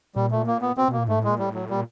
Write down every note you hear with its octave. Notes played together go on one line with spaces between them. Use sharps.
A#2 G3
A3
A#3
B3
B2 C4
B2
A#3
A#2
G#2 A3
A2
A#2 G#3
A2 G3
F#3
A#2 G3